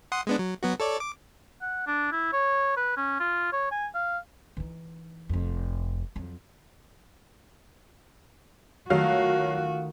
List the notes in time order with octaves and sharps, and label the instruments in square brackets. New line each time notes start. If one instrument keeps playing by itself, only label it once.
[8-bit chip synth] F#5 C6 D#6
G#3 B3 D4
F#3
F#3 B3 F#4
A4 C#5 D5
D6
[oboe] F#5
D4
E4
C#5
B4
C#4
F4
C#5
G#5
F5
[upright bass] E3 D#4
F1 F2
F2 F#3
[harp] D#3 A3 [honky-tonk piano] F#3 F5 [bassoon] F4 [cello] F#4